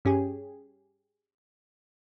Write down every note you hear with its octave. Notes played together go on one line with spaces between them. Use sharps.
G2 C#4 G4 G#4